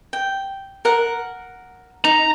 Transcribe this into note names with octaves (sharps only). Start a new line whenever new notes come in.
G5
A#4 F#5
D#4 A#5